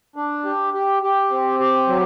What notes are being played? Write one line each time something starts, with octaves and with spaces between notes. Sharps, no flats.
D4
G4
G4
G4
C4
G4
F#3